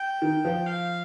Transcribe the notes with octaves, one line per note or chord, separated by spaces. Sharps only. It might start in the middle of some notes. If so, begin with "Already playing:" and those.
Already playing: G5
D#3
F3
F5